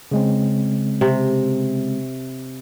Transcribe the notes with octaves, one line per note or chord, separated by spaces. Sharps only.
C#3 G#3 C4
C3